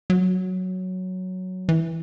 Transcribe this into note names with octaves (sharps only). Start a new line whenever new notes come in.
F#3
E3